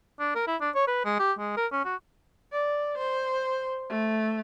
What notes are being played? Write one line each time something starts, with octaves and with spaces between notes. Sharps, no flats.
D4
A#4
E4
D4
C#5
B4
G#3
G4
G#3
A#4
C#4
F#4
D5
C5
A3